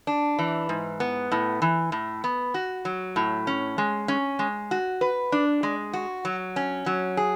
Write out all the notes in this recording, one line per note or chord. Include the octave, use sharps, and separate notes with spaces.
D4
E3
G#2
B3
A2
E3
A2
B3
F#4
F#3
A2
C#4
G#3
C#4
G#3
F#4
B4
D4
G#3
F#4
F#3
C#4
F#3
G#4